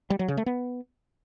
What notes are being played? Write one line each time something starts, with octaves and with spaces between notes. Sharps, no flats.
G3
F#3
C#3
A3
B3